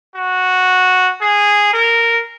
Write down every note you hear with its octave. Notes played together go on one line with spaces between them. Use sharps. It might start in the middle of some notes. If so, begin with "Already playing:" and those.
F#4
G#4
A#4